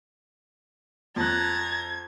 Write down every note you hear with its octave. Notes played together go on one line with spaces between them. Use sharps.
F2 A5 A#5 F#6 G#6